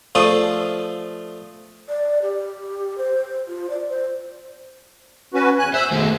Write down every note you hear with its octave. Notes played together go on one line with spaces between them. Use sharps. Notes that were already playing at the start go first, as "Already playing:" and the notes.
F3 A3 F4 G#4 D5
D5
G4
C5
F4
D5
C5
C#4 F#4 B4
E2 G#5 F#6
C5 E5 E6 F#6
B2 D#3 G#3 A3